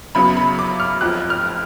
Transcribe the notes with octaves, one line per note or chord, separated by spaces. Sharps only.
F#2 C#3 F#3 B3 B5
B5
D6
F6
F1 F2 F3 F#6
F6